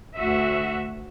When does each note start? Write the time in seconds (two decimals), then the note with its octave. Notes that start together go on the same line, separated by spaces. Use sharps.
0.17 D2 F#4 E5